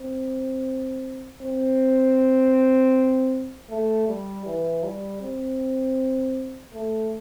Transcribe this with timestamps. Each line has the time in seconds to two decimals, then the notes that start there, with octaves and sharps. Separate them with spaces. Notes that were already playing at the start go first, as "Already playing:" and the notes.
Already playing: C4
1.42 C4
3.70 A3
4.08 G3
4.46 E3
4.84 G3
5.21 C4
6.73 A3